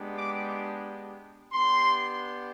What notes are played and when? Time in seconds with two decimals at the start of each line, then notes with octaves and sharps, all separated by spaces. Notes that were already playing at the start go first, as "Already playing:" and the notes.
Already playing: G#3 B3 D4 G4
0.17 D6
1.52 B3 D4 G4 C6